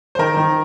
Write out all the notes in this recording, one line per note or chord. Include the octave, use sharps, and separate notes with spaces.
C5
D#3 A#4
D#3